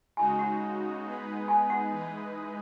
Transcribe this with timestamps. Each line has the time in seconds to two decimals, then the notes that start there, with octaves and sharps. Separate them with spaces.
0.17 C#3 G#3 D#4 F#4 G#5
0.39 F#5
1.05 G#3 B3 D#4 G#4 B4
1.48 G#5
1.70 F#5
1.92 E3 G#3 D#4 G#4 B4